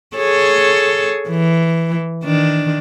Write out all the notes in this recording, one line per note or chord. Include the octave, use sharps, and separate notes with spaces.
G#4 A4 C#5
E3
D#3 D4